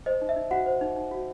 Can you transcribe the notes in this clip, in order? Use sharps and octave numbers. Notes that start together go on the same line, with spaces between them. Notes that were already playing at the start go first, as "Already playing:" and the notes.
C5 D#5
D#4
E5
D#4
F#4 F#5
C5
D#4
D#4
F#4